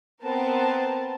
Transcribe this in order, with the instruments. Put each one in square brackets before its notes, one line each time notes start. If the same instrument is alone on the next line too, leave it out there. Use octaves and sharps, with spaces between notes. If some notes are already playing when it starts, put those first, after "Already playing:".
[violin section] B3 C4 A#4 A5